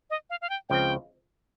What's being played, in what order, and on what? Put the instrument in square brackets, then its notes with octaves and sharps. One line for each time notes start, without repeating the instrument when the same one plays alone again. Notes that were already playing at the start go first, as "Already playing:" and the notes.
[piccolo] D#5
F5
F5
G5
[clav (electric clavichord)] C#2 C#3 F3 C4 [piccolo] G5